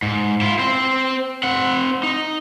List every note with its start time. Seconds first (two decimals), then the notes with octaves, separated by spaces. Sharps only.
0.02 G#2
0.41 E4 F4
0.59 C4 C5
1.43 C4 F#5
2.03 D#4